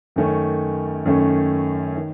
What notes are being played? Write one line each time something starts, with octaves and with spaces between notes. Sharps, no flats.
F#2 D#3 A3 C#4
F#2 D#3 A3 C#4
D#3